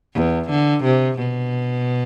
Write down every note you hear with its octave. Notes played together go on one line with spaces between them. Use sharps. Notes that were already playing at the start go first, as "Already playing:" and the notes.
E2
D3
C3
B2